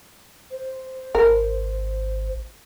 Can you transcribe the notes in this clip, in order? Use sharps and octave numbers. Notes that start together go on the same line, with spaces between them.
C5
G#1 A#4